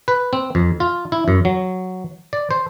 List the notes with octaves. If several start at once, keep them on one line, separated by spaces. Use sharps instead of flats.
B4
C4
F2
F4
E4
F#2
F#3
D5
C5